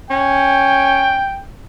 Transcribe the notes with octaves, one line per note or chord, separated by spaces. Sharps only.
C#4 G5